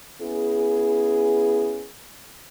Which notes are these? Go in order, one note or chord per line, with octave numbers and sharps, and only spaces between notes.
B3 C#4 E4 G#4